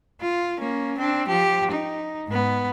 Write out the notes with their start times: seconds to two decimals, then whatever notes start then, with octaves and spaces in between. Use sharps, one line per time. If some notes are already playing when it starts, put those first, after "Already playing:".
0.21 F4
0.59 A#3 C#4
0.97 C4 D4
1.27 F3 G4
1.71 D#4
2.27 G#2 B3